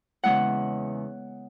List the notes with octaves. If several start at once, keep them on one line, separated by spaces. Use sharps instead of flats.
E2 C#3 G#3 E4 F#5